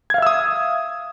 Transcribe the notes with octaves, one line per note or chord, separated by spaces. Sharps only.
E5 F5 D#6 E6 G#6